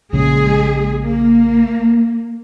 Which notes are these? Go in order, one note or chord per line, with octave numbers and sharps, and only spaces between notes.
A#1 A#2 C#3 G#3 G#4
A#3